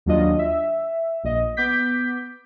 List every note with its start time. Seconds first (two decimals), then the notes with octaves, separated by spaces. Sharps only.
0.06 D#2 F#3 D4 F4 D#5
0.39 E5
1.24 A#1 D#5
1.57 B3 D6 G6 B6